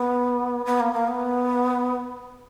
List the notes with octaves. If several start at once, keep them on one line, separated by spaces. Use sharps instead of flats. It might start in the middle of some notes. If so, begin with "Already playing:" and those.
Already playing: B3
B3
A#3
A#3
B3